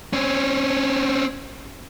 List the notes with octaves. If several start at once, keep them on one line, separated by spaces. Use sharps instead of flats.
C4 C#4